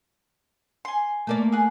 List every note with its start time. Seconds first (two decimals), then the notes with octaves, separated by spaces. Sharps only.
0.85 G#5 C6
1.27 A3 A#3 D5
1.52 G#4 F#5